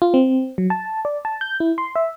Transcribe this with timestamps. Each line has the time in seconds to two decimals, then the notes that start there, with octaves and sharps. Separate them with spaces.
0.02 F4
0.14 C4
0.58 F#3
0.70 A5
1.05 D5
1.25 A5
1.41 G6
1.60 E4
1.78 C6
1.96 E5